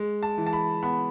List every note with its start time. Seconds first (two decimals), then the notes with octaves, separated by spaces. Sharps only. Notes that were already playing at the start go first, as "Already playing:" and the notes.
Already playing: G#3
0.23 A5
0.38 E3
0.47 A5
0.53 B5
0.83 B3 B5